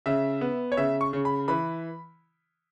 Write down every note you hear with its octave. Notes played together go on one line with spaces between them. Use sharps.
C#3 E5
B3
C#5
C#3 E5
C#6
C#3
B5
E3 B5